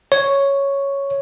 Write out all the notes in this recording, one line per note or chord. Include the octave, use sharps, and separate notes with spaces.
C#5